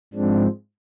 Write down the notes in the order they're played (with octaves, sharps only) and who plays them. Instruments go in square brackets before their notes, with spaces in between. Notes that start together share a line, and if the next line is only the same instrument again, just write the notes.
[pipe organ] G#2 F3 G#3 C4 D4